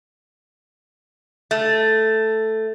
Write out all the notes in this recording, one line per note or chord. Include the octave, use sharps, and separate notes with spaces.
A3